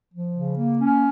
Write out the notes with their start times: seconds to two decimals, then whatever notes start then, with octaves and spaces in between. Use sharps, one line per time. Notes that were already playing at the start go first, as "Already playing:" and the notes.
0.13 F3
0.36 C#3
0.58 A#3
0.79 C#4